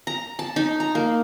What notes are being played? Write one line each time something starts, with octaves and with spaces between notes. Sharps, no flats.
A#5
A5
D#4
A#5
A#3